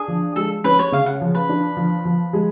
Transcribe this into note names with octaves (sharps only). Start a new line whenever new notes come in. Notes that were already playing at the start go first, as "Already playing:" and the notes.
Already playing: D4 G#4
F3
G#3 A4
C#4 B4
C#5
C#3 F5
F#5
F3
B4
D4
F3
F3
G#3